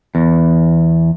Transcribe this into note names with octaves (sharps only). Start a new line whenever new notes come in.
E2